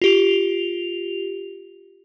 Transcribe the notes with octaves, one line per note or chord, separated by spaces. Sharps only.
F4 G4 F7